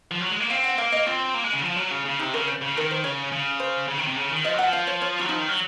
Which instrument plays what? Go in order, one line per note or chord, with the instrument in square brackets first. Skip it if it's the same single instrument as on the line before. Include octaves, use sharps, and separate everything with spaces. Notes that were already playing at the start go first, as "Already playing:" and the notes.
[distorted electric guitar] F3
F#3
G#3
A#3
[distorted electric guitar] C4 [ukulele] F5
[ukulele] F#5
[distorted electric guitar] A#3 [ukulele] F5
[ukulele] D#5
[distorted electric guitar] C4 [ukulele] F4
[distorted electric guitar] A#3
G#3
C#3
F3
F#3
C#3
C#3
[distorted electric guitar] C3 [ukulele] D#4
[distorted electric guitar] C#3 [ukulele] A#4
[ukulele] C5
[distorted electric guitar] C#3
[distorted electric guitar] D#3 [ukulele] A#4
[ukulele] C5
[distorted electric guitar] C#3 [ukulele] C#5
[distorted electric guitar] C#3
[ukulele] C5
[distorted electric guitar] C#3
D#3
C3
C#3
D#3
[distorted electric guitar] F3 [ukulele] D#5
[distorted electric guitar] F#3
[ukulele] F#5
[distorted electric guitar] F3
[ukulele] F5
C#5
C#5
[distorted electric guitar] F#3 [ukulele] F4
[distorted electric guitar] F3 [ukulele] D#4
[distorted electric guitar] D#3
F#3